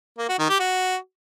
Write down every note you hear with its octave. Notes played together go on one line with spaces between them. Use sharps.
A#3
F#4
D#3
G4
F#4